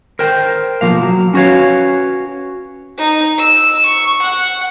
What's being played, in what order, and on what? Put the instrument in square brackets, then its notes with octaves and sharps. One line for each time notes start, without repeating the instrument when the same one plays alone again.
[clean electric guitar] A#4 C5 G5
B1 F3 A#3 F5
F#3
C#4 F#4 B4 C#5 F5
[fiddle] D#4
E6
C#6
F#5